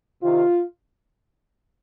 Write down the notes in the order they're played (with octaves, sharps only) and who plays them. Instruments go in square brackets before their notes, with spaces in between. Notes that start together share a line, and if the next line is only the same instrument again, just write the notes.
[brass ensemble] C3 D#3 F4